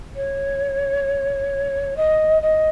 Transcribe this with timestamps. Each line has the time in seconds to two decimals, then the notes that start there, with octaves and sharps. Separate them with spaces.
0.15 C#5
1.96 D#5
2.42 D#5